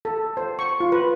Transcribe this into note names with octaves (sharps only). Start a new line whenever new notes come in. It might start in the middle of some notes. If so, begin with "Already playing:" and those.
A4
C5
C#6
F4
B4